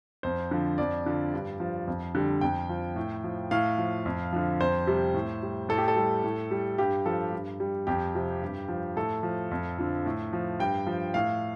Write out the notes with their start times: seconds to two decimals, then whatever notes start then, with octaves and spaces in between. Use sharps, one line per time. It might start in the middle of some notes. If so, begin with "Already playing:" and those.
0.23 F2 C5
0.51 D3 F3
0.78 F2 D5
1.06 D3 F3
1.34 G2
1.60 F3
1.87 F2
2.15 D3 G3
2.41 F2 G5
2.69 F3
2.96 A2
3.24 F3
3.51 A2 F5
3.78 F3
4.06 F2
4.32 D3 F3
4.61 F2 C5
4.87 C3 G3
5.14 A2
5.42 G3
5.69 A2 A4
5.78 G4
5.88 A4
5.97 G3
6.24 A2
6.51 G3
6.78 G2 G4
7.06 F3 A4
7.32 G2
7.60 G3
7.87 F2 G4
8.14 C3 F3
8.42 G2
8.68 F3
8.96 A2 A4
9.23 F3
9.51 F2
9.79 D3 F3
10.06 A2
10.33 F3
10.59 G2 G5
10.87 F3
11.14 A2 F5